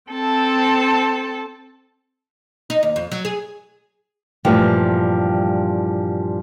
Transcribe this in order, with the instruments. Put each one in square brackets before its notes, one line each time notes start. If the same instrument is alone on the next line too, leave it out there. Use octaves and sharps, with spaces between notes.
[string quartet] C4 A4 A5
[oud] D#4
D#2
F2
F#3
G#4
[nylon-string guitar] G2 A#2 E3 F3 G3 A3